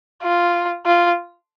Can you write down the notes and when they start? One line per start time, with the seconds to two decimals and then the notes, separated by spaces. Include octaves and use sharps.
0.23 F4
0.86 F4